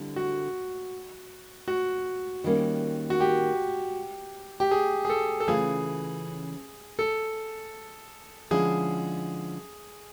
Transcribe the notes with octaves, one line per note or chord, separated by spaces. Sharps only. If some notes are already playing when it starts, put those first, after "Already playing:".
Already playing: D3 G3 C4 E4
F#4
F#4
D#3 G3 A#3 C#4
F#4
G4
G4
G#4
G#4
A4
A4
C#3 E3 A3 C#4 F4 G#4
A4
D3 F3 G#3 C#4 E4 G#4